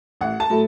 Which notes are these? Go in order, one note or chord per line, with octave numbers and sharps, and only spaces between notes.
A1 F#5
A5
A2 F#3